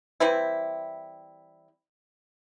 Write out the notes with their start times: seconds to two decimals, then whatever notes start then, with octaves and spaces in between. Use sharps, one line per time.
0.20 E3 G3 C4 E4